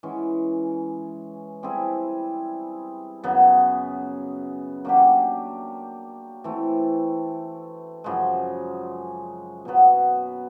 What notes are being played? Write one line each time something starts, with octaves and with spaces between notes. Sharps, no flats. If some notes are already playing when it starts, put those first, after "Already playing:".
E3 G#3 C#4
G3 C4 E4 G#4
F#2 C#3 F#3 B3
F#3 A#3 D4 G4
E3 A3 C4
F#2 C#3 F3 G#3
B2 F#3 B3